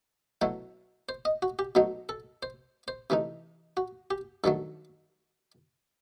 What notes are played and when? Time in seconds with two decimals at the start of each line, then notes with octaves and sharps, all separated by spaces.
0.41 B2 F#3 A3 E4
1.09 C5
1.25 D#5
1.42 F#4
1.59 G4
1.75 B2 F#3 A3 D#4
2.09 A4
2.43 C5
2.88 C5
3.10 C3 E3 A3 D#4
3.77 F#4
4.11 G4
4.44 G2 D#3 F#3 A3 A4